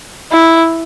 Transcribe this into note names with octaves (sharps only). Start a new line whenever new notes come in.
E4